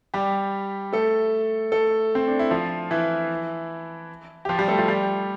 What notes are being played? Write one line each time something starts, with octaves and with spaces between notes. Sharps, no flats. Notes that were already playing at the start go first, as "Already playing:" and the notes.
G3 G4
A3 A4
A3 A4
C4
D4
E4
F3 F4
E3 E4
G4
F3 F4
G3 G4
A3 A4
F3 F4
G3 G4